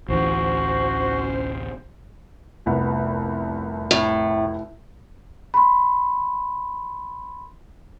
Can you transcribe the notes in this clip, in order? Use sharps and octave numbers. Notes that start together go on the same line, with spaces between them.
A1 D2 E3 C#4 F#4 C5
F1 C2 B3
A2
B5 C6